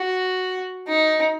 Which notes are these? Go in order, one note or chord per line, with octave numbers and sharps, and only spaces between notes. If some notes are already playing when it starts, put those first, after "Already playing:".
Already playing: F#4
D#4